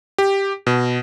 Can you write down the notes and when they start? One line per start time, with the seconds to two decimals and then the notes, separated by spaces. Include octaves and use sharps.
0.18 G4
0.67 B2